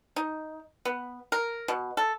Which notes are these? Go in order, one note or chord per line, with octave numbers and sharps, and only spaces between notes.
D#4
B3
A#4
B2
A4